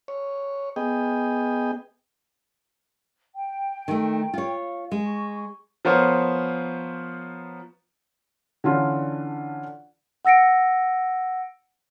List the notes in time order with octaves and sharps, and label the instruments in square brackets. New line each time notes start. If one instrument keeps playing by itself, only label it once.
[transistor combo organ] C#5
B3 G#4 D#5 G5
[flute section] G5
[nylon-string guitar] D#3 A3
F4 C#5
G#3
[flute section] C#6
[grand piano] F3 B3 A#4 C5 C#5
[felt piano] D3 E3 C#4 D4 F4
[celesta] F#5 E6 A#6 C#7 D7